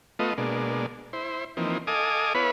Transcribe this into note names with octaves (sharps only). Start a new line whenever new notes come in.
A3 B3 F4 D#5
B2 G#3 A#3 D4
E4 C5
E3 F3 A#3 C4 D#4
A4 D#5 F5 G#5 D6 D#6
B3 E4 B4 C#5 F5 B5